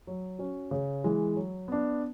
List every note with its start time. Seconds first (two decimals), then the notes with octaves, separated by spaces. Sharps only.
0.07 F#3
0.39 C#4 F#4
0.71 C#3
1.04 E3 G#3
1.36 F#3
1.68 B3 D4